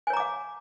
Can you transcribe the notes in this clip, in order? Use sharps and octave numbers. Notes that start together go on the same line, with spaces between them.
C#5 F5 G#5 A#5 D6